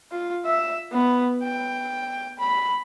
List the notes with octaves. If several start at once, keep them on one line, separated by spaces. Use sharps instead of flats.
F4
E5
B3
G5
B5